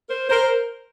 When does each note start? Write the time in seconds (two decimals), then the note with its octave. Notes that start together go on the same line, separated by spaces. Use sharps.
0.09 A#4 C5
0.29 A#4 C5